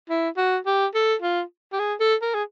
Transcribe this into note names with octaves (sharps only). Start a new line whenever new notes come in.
E4
F#4
G4
A4
F4
G4
G#4
A4
A#4
G#4